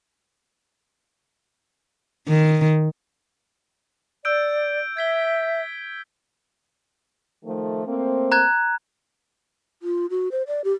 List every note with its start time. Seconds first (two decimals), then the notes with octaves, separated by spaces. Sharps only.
2.28 D#3
4.25 D5 E6 G6 D7
4.97 E5 G#6 B6 G7
7.45 D#3 F3 A3
7.85 A3 A#3 C4
8.32 A#5 F#6 G#6
9.83 F4
10.10 F#4
10.32 C5
10.47 D5
10.64 G4